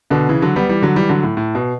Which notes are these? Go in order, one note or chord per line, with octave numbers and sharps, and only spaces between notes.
B2 D3
C#3 E3
D3 F#3
G3 B3
E3 G3
D3 F#3
E3 G3
D3 F#3
A2
A2
B2